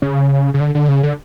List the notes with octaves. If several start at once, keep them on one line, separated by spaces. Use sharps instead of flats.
C#3
C#3
D3
D3
C#3
D3